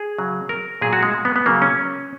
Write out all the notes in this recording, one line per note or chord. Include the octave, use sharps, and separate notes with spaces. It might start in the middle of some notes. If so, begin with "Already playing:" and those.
Already playing: G#4
C#3 F#3
A#4
A#2 F#3 G#4
F#4
G#3
B3
B3
C#3 F#3 A#3
C#4